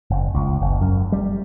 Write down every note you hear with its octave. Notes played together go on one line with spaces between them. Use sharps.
F#1
C#2
F#1
F#2
G3